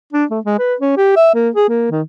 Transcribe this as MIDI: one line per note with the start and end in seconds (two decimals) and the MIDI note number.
0.13 0.25 62
0.31 0.39 57
0.45 0.56 56
0.59 0.75 71
0.80 0.92 61
0.97 1.15 67
1.16 1.32 76
1.35 1.49 58
1.55 1.66 68
1.69 1.90 58
1.91 2.02 51